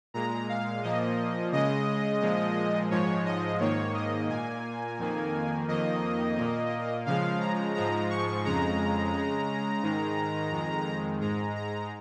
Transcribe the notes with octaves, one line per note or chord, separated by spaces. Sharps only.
A#2 G#3 A#5
F5
A#2 F3 A#3 D#5
C#3 G#3 D#5
A#2 F3 G#3
G#2 F3 G#3 C#5
D#5
G#2 D#3 A#3 C#5
D#5
A#2 A#3 G#5
F2 D#3 A#3
F2 D#3 A#3 D#5
A#2 A#3
C#3 F3 G#3 F5
A#5
G#2 F3 G#3 A#5
C#6
F2 C#3 G#3 A#5
C#3 G#3
G#2 D#3 G#3
F2 D#3 G#3
G#2 G#3 A#5
A#5